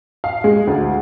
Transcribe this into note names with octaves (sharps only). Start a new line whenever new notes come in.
F5
G#3
D2